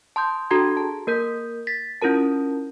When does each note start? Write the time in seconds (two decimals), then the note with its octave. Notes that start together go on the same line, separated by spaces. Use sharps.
0.16 A5 C6 D#6 G6
0.51 D4 F#4 A4 A#5 C6 G#6
0.77 G#4 A5
1.07 A#3 A#4 G6 B6
1.67 A6 B6
2.02 C#4 E4 F4 A#4 A5